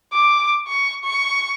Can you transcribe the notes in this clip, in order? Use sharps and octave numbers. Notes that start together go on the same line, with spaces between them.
D6
C#6
C#6